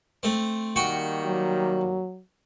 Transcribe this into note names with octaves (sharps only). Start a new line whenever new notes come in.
A3 C4
D#3 G3 A#3 F#4 G5 C#6
F#3